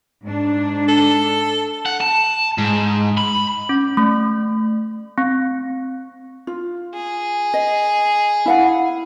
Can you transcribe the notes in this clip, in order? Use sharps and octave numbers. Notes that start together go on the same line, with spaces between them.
G#2 D4
A4
F#5
A5
G#2
B5
C#4
A3
C4
F4
G#4
D#5
E4 F5 F#5